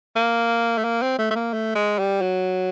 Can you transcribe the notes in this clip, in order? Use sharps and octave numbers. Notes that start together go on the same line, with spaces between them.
A#3
A3
A#3
C4
A3
A3
A#3
A3
G#3
G3
F#3